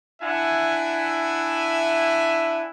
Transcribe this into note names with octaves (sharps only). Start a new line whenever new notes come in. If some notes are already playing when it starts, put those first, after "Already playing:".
D4 E4 E5 F#5 G#5